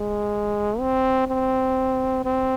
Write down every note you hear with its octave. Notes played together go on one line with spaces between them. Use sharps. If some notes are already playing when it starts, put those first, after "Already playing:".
Already playing: G#3
C4
C4
C4